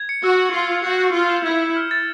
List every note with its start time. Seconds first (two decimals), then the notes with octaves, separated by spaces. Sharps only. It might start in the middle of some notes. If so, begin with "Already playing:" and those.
Already playing: G#6
0.09 C#7
0.24 F#4 E6
0.40 F#7
0.54 F4 C7
0.69 F7
0.85 F#4 G6
1.00 G6
1.15 F4 C7
1.30 E7
1.45 E4 G#6
1.61 G#6
1.76 F6
1.91 A6